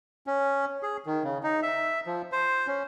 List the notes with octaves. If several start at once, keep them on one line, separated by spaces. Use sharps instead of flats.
C#4
G#4
D#3
C#3
D#4
E5
F3
C5
C#4